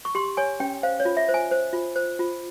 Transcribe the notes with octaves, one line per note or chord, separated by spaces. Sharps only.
C#6
G4 C6
C#5 G#5
C#4 G5
C5 F5
C#5
F4
E5
C5
G#5
C5
F4
C5
F4